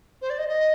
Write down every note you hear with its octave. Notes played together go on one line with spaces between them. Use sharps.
C5
D5
D#5
D#5